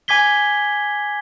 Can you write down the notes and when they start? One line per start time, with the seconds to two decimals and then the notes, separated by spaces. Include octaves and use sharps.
0.08 G#5 D6 G#6 B6 G7